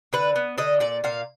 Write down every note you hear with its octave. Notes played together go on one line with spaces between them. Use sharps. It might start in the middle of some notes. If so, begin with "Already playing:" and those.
D3 B4
B3
D3 D#5
A#2 D5
A#2 F5